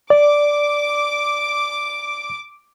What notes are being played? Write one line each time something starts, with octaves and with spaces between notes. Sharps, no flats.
D5 D6